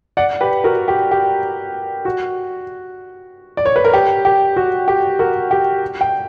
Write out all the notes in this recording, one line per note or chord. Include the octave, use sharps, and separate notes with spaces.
D5 F#5
G4 B4
F#4 A#4
G4
G4
F#4
D5
C#5
B4
A#4
G4
G4
F#4
G4
F#4 A#4
G4
G5